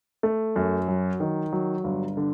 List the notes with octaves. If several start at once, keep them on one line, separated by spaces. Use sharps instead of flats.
A3
F#2
F#3
D#3
F#3
G1
D3